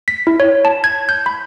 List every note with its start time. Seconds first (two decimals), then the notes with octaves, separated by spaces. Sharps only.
0.08 B6
0.27 E4
0.40 C#5
0.65 A5
0.84 G#6
1.09 G6
1.26 B5